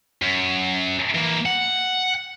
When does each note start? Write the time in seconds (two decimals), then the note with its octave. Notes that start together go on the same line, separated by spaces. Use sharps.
0.22 F#2
1.15 E3 A#3
1.46 F#5